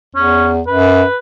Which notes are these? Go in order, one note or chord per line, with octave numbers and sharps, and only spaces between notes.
E2 C#4
F#2 B4